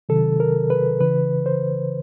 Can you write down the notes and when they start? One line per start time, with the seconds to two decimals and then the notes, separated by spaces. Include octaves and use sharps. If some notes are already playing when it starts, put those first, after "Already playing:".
0.09 C3 D#3 F#3 A4
0.40 A#4
0.70 B4
1.01 C#3 E3 B4
1.46 C5